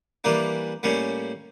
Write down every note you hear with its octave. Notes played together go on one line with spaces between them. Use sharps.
E3 G3 A#3 D4
A2 G3 A#3 C#4